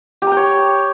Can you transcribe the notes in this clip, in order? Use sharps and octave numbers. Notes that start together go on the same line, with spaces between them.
G4 C#5 G5 A#5